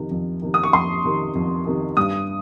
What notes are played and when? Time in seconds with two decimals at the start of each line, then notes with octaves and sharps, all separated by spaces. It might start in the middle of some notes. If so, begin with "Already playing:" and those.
Already playing: F2 C3 D#3
0.11 F2
0.42 C3 D#3
0.54 D#6
0.63 C#6
0.73 F2 C6
1.04 C3 D#3
1.35 F2
1.66 C3 D#3
1.97 G2 D#6